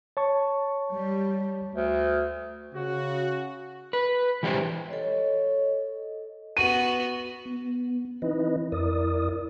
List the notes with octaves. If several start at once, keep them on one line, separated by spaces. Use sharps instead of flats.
C#5 A5 C#6
G3
D2
C#3 F#4
B4
E3 G#3 G4 A4 C5
A4 C#5 D#5
B3 F#4 D#7
B3
E3 C4 D#4 E4 B4 D#5
F2 E4 A#4 D5 D#6